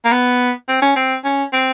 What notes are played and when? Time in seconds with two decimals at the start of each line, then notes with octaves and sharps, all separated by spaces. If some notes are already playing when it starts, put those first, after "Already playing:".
0.05 A#3
0.12 B3
0.69 C4
0.82 C#4
0.96 C4
1.24 C#4
1.53 C4